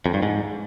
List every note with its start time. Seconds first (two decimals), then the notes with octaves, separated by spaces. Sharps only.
0.06 F2
0.14 G2
0.22 G#2